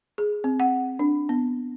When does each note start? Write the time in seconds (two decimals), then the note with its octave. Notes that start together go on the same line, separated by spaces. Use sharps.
0.18 G#4
0.44 C4
0.60 F#5
0.99 D4
1.29 B3